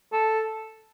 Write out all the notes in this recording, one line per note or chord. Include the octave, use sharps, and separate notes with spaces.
A4